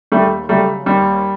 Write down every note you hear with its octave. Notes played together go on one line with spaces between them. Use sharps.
D#2 G3 A3
C#3 F#3 G3 A3
D#2 G3